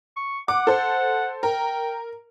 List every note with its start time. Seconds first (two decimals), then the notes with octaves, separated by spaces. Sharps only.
0.16 C#6
0.48 F#5 D6
0.67 A4 C5
1.43 A#4 G5